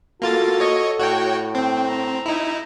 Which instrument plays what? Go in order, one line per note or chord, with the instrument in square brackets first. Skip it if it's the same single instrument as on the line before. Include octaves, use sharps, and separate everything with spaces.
[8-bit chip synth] A#3 F4 A6 [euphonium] F#4 [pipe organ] A4
[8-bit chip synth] C#5 D#5 C#6
[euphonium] A2 [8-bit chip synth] F#4 C#5 G5
[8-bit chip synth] C4 [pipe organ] G5
[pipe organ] A#5
[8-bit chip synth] D#4 E4